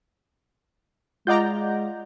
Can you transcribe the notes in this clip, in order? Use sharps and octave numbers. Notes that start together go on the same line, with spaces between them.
G#3 F4 D5 D#5 F#5 A#5 G6